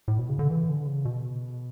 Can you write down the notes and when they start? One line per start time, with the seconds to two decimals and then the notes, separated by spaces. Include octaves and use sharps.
0.08 A2
0.19 B2
0.29 C#3
0.39 D3
0.50 E3
0.69 D3
0.86 C#3
1.05 B2